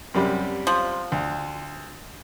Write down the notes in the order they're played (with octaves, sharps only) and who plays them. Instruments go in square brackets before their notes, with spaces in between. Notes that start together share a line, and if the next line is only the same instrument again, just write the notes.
[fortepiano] F#2 C3 G3
[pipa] F3
[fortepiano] D2